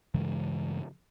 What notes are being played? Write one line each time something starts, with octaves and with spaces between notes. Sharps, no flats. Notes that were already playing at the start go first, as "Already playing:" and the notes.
G2 C#3 E3 G#3